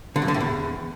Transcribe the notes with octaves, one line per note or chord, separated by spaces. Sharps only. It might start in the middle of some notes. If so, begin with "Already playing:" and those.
D3
F#2
D3
A2
E2